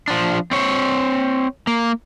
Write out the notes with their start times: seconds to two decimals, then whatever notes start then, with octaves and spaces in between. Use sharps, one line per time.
0.08 F3 D4
0.51 C4 C#5
1.67 A#3